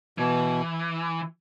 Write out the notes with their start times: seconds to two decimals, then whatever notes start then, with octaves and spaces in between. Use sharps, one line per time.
0.18 B2 E3